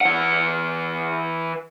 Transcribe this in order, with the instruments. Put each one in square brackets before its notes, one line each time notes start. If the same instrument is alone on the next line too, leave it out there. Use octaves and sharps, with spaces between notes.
[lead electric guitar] E3 F#5